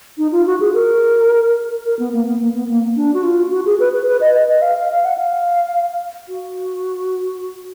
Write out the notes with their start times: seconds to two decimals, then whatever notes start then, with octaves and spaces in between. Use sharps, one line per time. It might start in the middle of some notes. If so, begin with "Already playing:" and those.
0.18 D#4
0.32 F4
0.46 F#4
0.60 G#4
0.74 A#4
1.85 A#4
1.99 B3
2.13 A#3
2.26 B3
2.40 A#3
2.54 B3
2.69 A#3
2.96 D4
3.14 F#4
3.23 F4
3.51 F#4
3.66 G#4
3.80 B4
3.93 B4
4.07 B4
4.21 D#5
4.35 D#5
4.49 D#5
4.62 F5
4.76 F5
4.91 F5
5.04 F#5
5.18 F5
6.28 F#4